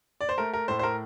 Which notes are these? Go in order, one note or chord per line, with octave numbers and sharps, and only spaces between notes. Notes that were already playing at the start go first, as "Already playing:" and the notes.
D5
C5
A3 A#4
A#4
A2 C5
C5
A#4